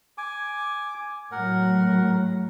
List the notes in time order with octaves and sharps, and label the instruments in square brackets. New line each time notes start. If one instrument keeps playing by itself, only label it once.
[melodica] G#5 D6
[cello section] A2 F#3 [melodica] A#4 F#5